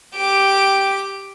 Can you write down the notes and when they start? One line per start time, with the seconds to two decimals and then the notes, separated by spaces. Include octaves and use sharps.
0.16 G4 D6